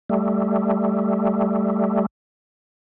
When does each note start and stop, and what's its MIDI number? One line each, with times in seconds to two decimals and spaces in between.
0.09 2.06 55
0.09 2.06 57